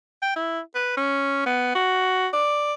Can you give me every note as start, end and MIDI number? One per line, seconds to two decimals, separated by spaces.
0.22 0.32 79
0.36 0.60 64
0.75 0.94 71
0.97 1.46 61
1.46 1.71 59
1.75 2.27 66
2.33 2.73 74